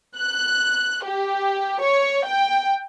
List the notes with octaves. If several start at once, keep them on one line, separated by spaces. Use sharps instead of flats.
F#6
G4
C#5
G5